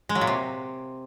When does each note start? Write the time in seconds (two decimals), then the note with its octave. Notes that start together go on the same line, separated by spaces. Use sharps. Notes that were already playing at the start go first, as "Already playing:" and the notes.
0.09 G#3
0.15 F#3
0.21 A#2
0.27 C3